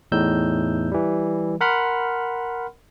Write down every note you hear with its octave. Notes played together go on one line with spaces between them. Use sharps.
E2 A2 D#4 E6 G6
E3 G3
A#4 F#5 B5 C6 F6